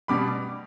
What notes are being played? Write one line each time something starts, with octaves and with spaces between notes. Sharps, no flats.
B2 G3 B5 D6